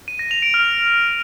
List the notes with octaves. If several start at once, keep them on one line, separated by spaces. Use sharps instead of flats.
D#7
A#6
F7
D7
F6